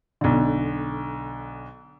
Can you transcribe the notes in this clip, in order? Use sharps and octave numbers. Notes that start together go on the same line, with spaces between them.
B1 D3